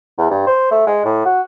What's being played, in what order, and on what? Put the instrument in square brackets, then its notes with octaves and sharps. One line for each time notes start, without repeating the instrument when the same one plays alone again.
[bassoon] E2
G2
C5
A3
G#3
A2
F#4